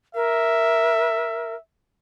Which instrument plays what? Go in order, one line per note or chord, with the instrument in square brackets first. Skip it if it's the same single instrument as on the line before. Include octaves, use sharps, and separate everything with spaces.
[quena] A#4 [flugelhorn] E5